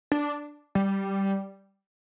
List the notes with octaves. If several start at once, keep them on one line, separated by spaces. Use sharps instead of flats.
D4
G3